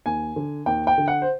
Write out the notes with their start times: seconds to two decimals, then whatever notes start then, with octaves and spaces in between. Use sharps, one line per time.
0.06 D#2 G#5
0.36 D3
0.66 D#2 G5
0.87 G5
0.98 D3
1.08 F#5
1.22 C5